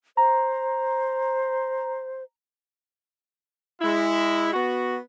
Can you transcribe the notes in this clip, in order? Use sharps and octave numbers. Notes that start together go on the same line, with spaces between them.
C5 A#5
G#3 E4
B3 F#4